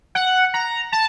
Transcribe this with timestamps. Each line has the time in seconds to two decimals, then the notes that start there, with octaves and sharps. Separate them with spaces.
0.15 F#5
0.54 A#5
0.92 A5